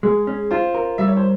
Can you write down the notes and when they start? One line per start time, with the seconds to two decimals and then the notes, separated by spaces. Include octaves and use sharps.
0.03 G#3 G#4
0.27 C#4
0.51 F4 C5
0.74 A#4
0.98 G3 E5
1.08 C#5
1.17 C5